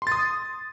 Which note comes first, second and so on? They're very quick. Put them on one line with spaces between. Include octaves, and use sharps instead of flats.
C6 A6 D#6